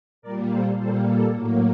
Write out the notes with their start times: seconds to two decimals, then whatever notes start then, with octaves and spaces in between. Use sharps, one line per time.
0.22 A#2 G3 A#3 A#4 D5
0.50 A4 C5
0.78 A#2 G3 A#3 A4 C5
1.07 A4
1.35 A2 F#3 A#3